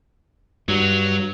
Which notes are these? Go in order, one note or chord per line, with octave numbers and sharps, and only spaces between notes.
G2 F#3